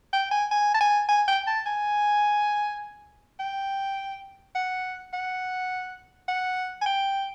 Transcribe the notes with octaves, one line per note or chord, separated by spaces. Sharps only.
G5
G#5
G#5
A5
G#5
G#5
G5
A5
G#5
G5
F#5
F#5
F#5
G#5
G5